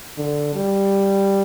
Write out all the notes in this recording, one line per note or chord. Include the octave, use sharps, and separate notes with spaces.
D3
G3